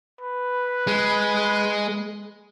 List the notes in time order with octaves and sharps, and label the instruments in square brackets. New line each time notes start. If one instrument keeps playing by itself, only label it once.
[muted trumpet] B4
[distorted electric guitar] G#3